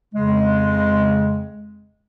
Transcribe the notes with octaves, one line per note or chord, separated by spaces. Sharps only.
F2 C#3 G#3